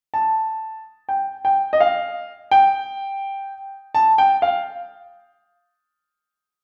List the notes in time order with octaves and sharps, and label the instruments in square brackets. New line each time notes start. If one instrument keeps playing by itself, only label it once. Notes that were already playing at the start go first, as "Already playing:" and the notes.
[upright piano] A5
G5
G5
D#5
F5
G5
A5
G5
F5